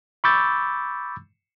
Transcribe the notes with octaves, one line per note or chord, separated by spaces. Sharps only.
B5 C#6 D6 E6 G6 A6